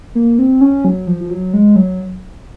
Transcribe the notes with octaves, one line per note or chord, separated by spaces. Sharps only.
A#3
C4
C#4
F#3
F3
F3
F#3
G#3
F#3